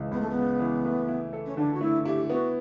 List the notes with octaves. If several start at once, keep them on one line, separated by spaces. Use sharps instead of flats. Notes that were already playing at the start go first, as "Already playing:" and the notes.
Already playing: C#2 C#3 E3
C#2 B3
A3
B3
C#3
E3
A3
E4
A4
C#4
D3 D4
F#4
A3 E4
E4 G4
B3 F#4